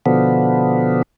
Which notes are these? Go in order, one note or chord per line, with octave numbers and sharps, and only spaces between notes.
B2 D3 F3 B3